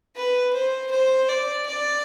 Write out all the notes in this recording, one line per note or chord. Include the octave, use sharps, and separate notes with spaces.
B4
C5
C5
D5
D5